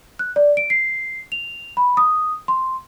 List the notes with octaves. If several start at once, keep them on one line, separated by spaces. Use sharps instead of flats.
F#6
D5
D7
C7
F7
B5
D#6
C6